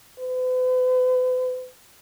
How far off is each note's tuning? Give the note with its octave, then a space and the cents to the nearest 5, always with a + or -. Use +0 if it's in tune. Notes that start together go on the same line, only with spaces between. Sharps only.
B4 +45